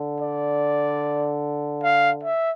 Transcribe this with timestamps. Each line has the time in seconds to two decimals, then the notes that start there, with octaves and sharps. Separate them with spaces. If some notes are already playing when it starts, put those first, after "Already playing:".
Already playing: D3
0.20 D5
1.83 F5
2.23 E5